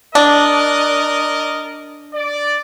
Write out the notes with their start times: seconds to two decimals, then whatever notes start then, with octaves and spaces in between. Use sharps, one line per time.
0.15 D4 A#4 D5 D#5
2.14 D5